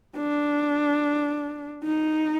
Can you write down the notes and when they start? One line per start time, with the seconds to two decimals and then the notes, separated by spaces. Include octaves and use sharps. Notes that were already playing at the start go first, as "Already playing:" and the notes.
0.17 D4
1.83 D#4